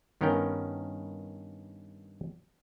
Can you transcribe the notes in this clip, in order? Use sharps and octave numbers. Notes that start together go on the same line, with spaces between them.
G2 D#3 B3 C#4 A#4 G5